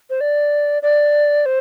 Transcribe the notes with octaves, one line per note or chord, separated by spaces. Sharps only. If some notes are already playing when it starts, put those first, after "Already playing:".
C5
D5
D5
C5